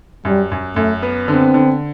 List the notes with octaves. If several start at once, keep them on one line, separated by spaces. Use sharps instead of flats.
F#2 G3
F#2
F#2 A3
B3
D3 C4
D3